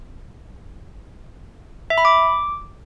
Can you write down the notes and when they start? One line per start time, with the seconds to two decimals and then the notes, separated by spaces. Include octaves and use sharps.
1.90 E5
1.98 B5
2.05 D6